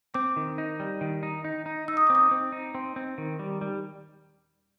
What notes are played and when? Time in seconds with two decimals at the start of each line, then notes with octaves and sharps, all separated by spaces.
0.14 C4 D6
0.36 D#3
0.58 D#4
0.80 G3
1.01 D#3
1.23 D#4
1.44 D#4
1.66 D#4
1.88 D#4 E6
1.97 D#6
2.07 C4 D6
2.15 D#6
2.31 C4
2.52 D#4
2.75 C4
2.96 C4
3.18 D#3
3.39 G3
3.61 G3